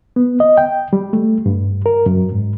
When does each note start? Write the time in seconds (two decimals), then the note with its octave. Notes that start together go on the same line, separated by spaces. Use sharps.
0.16 B3
0.40 D#5
0.57 G5
0.93 G3
1.13 A3
1.46 G2
1.86 A#4
2.06 F#2
2.32 G#2